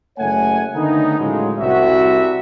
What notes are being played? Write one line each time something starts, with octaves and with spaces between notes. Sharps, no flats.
F#1 A3 C#5 F#5 G#5
D3 D#3 A3 B3 D#4
A2 C#3 F3 F#3 G#3
C2 F#4 E5